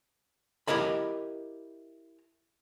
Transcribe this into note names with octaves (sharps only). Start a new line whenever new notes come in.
E4 G4 A#4 D#5 B5